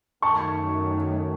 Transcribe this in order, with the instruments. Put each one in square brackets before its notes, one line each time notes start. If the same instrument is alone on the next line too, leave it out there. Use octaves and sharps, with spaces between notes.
[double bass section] F#2 D#3 F#3 A3 [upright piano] A5 C#6